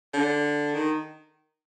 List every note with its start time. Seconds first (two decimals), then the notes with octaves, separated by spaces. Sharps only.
0.14 D3
0.75 D#3